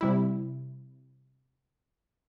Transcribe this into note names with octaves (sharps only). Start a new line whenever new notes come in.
C3 G3 E4